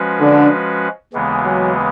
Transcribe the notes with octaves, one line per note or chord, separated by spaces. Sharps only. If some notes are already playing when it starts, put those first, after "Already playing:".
Already playing: F3 G#3 C#4 F#4 B4
D3
D#2 C#3 E3 G#3 B3
F#3